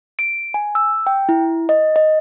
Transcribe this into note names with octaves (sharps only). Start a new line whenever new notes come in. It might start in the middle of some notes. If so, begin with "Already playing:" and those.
D7
G#5
E6
G5
E4
D#5
D#5